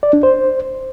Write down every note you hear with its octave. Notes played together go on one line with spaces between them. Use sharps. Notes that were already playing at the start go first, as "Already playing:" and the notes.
D5
D4
C5